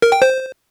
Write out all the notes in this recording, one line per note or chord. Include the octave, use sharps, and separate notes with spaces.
A#4
G5
C5